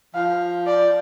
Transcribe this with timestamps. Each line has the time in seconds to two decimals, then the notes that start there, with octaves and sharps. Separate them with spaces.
0.14 F3 F5
0.66 D5